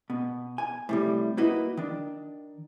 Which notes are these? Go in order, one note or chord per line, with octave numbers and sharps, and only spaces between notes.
B2
G#5
A2 C3 G3
A#3 E4 F#4 B4 D#5
D#3 D4